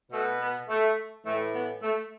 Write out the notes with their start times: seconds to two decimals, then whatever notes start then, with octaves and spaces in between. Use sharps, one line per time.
0.11 B2 A3
0.40 B3
0.68 A3
1.25 A2 E3 A3
1.54 B3
1.82 A3